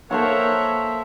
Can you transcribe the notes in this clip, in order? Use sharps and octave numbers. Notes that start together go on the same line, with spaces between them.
A#3 A4 A#4 C5 C#5 E5 F#5 C#6